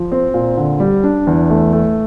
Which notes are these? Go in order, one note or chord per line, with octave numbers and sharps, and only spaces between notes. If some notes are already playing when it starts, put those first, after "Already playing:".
Already playing: F3
C4
A#2
D3
G3
D4
E2
A3
A3